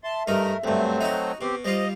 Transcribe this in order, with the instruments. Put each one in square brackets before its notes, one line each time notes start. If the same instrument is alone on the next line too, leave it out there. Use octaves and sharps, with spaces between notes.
[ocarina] E5 [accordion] A5 C6
[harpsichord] G2 D#4 [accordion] A3 A#4
[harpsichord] D2 G2 [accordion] F#3 A3 C4
[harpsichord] D#4 F#4
[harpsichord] B2 [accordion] C4 G4
[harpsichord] G3 F4 [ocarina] C5 [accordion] D#5